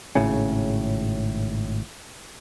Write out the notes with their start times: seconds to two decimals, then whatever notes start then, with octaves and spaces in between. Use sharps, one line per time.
0.15 G#1 A2 C#3 C#4